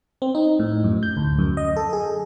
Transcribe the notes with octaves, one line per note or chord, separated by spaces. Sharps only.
C4
D#4
A2
F#2
G6
D2
F#2
D#5
A4
G#4